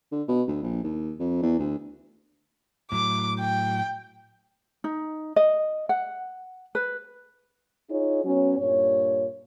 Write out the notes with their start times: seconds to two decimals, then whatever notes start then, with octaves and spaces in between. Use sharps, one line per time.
0.12 D3
0.28 B2
0.48 D2
0.63 A#1
0.83 D#2
1.19 F2
1.42 E2
1.59 D2
2.92 A2 F#3 D6
3.40 G5
4.84 D#4
5.36 D#5
5.89 F#5
6.75 B4
7.90 D#4 F4 G#4 C#5
8.25 F#3 B3 C#4
8.59 G2 A#2 C#5